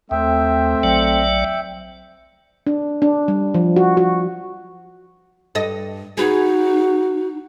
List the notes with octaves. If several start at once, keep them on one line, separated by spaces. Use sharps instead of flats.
D#2 A3 C4 E5 G5
A#1 F#3 D5
D4
D4
G3
F3
F#4
F#4
G2 A4 D#5
D#4 F#4 G#4 B4